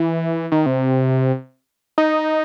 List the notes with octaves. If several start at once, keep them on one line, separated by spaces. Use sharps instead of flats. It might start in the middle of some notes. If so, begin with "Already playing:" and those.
Already playing: E3
D#3
C3
D#4